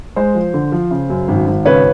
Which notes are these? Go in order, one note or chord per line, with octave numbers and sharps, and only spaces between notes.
G#3 C5
F3
D3
F3
C#3
F#2
G#1
G#1
C#3 B4 C#5